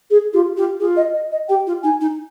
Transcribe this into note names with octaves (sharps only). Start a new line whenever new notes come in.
G#4
F4 G4
F4 G4
F4 G#4
D#5
D#5
D#5
G4 G5
F4
D#4 G#5
D#4